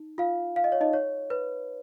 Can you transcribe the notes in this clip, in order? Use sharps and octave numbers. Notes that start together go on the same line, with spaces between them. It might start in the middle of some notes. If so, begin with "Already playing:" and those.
Already playing: D#4
F4 F5
F5
D#5
C#5
D#4 D#5
C#5
B4